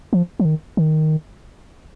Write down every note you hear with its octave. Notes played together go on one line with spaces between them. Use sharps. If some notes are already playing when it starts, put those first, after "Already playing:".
F3
F3
D#3
D#3